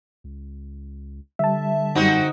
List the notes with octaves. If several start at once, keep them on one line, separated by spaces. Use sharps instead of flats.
C#2
D3 G3 E5 A5
F#2 G3 C4 D#4 F#4